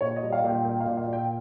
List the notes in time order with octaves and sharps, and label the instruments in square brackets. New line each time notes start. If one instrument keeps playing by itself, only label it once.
[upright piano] A#2 C#5
D#5
G3
F5
A#2 G5
A#3 G5
F5
A#2
F5
A#2
G5